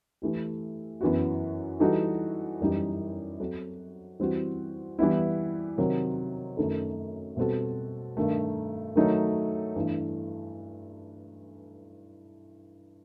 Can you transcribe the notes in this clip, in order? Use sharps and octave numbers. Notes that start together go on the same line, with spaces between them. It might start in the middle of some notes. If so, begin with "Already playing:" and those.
E3 A3 E4 G4
F#2 E3 B3 F#4
E3 G3 D#4 F#4 A4
F#2 E3 G3 D#4
F#3 C4 F#4 A4
E3 G3 C4 F#4
E3 G3 B3 E4
C3 D#3 F#3 C4
F#2 D#3 A3 D#4 A4
B2 G3 C4 F#4 A4
G2 D#3 A3
D#3 F#3 A3 D#4 A4
G2 E3 A3